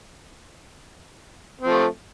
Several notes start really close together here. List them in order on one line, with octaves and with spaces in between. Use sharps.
C4 F3 A3